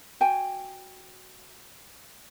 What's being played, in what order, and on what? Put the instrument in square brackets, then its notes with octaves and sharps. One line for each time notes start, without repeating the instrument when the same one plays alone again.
[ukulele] F#4 G5 G#5